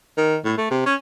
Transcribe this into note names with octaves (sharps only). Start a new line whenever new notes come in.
D#3
A2
A3
C3
C#4